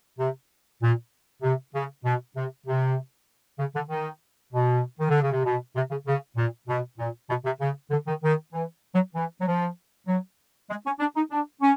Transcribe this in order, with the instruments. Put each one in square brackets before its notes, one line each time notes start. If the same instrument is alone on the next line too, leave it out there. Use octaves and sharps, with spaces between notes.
[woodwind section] C3
A#2
C3
C#3
B2
C3
C3
C#3
D3
D#3
B2
D#3
D3
C#3
C3
B2
C3
C#3
C#3
A#2
B2
A#2
B2
C3
C#3
D3
D#3
D#3
E3
F#3
E3
F#3
F3
F#3
G#3
C#4
D4
D#4
D4
C#4